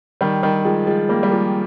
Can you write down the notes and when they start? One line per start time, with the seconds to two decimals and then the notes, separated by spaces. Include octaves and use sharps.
0.21 D#3 G3
0.43 D#3 G3
0.65 F3 G#3
0.87 F3 G#3
1.09 G3 A#3
1.23 G3
1.31 F3 G#3